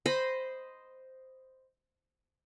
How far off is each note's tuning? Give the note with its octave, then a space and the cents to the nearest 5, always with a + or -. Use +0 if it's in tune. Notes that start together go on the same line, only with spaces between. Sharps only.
C5 -5 D#5 +0 B5 +10